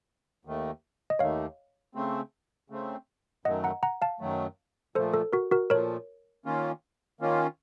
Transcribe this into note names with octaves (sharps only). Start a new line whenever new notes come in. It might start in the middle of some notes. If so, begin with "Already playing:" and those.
D#2 D#3 A3
D#5
D#2 D#3 A3 C#5 F5
C#3 A3 C4
C#3 A3 C4
F#2 D#3 F#3 A3 D#5 F#5
F#5 A#5
F#5 A#5
F5 A5
F#2 D#3 F#3 A3
A#2 F3 A3 A4 C5
A4
F#4 A#4
F#4 A#4
A#2 F3 A3 A#4 C#5
D#3 A#3 C#4 F4
D#3 A#3 C#4 F4